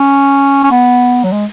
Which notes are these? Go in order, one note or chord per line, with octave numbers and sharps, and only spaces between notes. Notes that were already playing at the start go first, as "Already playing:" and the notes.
Already playing: C#4
C#4
B3
F#3
G#3